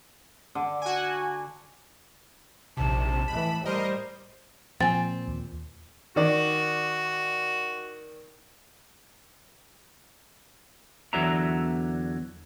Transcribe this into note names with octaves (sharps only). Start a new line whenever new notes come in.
D3
F#4 G#5
A#1 D#2 C3 A5
A2 E3 B5
G3 A#4 C5 D#5
A#2 F3 C4 G#5 A6
D#2
D#3 F#4 D5
E2 D3 F#3 E5 A#5